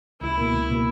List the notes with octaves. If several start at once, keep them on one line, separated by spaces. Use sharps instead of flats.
C#2 E4
B2 A#3
C#2
B2 A#3